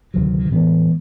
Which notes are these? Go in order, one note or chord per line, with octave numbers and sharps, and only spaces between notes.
D2 C3 D#3 F#3
A2 E3 G#3 B3